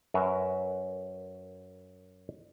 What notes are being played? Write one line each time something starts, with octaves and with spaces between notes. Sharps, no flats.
F#2 F#3 A#4 B4 E5